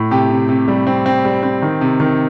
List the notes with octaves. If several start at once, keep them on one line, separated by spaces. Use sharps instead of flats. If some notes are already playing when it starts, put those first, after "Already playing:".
Already playing: A2
C3 G4
C3
C3
G3
C4
C4
G3
C4
D#3
C3
D#3